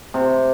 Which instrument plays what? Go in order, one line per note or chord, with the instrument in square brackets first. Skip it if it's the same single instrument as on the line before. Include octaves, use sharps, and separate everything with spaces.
[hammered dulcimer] C3